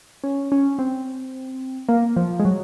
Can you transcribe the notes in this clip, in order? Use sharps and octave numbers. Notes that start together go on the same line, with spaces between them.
C#4
C#4
C4
A#3
F3
G#3
F#3